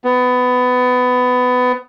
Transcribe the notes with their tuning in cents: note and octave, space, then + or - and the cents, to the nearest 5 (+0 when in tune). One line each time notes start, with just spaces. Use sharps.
B3 +20